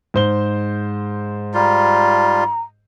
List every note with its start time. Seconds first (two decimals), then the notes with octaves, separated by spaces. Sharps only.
0.14 G#2 C5 G7
1.54 G3 F4 A#5